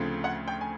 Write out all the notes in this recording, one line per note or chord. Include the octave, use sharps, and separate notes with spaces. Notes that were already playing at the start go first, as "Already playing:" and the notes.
Already playing: D2 C#3 F3 A3 C4
F#5
G5
G#5